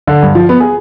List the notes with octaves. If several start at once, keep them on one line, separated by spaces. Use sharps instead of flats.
D3
G2
F3
B3
G#4